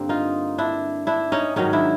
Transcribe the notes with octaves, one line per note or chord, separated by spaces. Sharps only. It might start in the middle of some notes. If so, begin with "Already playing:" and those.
Already playing: G2 D3 A#3 C4
D#4 F4
D4 E4
D4 E4
C#4 D#4
G#2 D#3 F#3 C#4 D#4
D4 E4